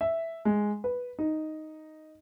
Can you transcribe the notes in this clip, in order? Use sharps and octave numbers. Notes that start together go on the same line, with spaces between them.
E5
G#3
B4
D#4